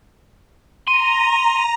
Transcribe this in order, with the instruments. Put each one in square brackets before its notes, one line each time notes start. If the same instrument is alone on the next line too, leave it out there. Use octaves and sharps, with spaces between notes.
[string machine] A#5 [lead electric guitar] C6 [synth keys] D#7